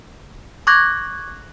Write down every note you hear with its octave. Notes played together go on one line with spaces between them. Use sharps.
C#6 D6 F#6 G#6 A#6